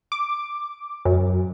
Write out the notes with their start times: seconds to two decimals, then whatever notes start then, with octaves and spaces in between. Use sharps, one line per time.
0.12 D6
1.05 F#2